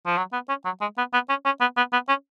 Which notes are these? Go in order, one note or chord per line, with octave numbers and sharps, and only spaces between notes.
F3
F#3
B3
C#4
F#3
G#3
B3
B3
C#4
C#4
B3
B3
B3
C#4